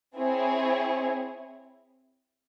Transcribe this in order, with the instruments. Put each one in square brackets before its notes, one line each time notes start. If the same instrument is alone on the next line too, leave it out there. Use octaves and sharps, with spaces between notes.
[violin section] C4 E4 G#4 C#5